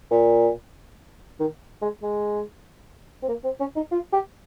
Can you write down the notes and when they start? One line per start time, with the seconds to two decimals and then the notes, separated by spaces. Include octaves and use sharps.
0.11 A#2
1.40 D#3
1.82 G#3
2.03 G#3
3.23 C4
3.29 A#3
3.44 C4
3.60 C#4
3.76 D#4
3.91 F4
4.13 G4